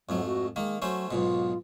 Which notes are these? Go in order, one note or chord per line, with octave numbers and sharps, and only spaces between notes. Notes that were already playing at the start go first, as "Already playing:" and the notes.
F2 G#2 F#3 A3
F#4
D#3 G#3 A#3
F#3 A3 C#4 C5
B1 G#2 B2 F4